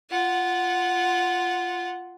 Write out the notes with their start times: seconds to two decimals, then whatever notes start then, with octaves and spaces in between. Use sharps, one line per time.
0.10 F4 F#5